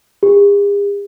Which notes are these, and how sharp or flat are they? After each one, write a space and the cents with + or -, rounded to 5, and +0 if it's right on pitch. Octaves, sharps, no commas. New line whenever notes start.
G#4 -45